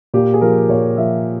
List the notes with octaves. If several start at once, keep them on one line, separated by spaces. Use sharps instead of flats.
A#2 G4
G#4
F3 A#4
A#2 C#5
F3 E5